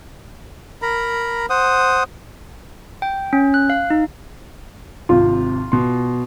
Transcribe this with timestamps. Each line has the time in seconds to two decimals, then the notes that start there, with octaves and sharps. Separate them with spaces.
0.82 A#4 A#5 B5
1.50 C5 F#5 D#6
3.02 G5
3.33 C#4
3.54 F#6
3.70 F5
3.90 D#4
5.09 G#1 C3 F4
5.72 B2 C6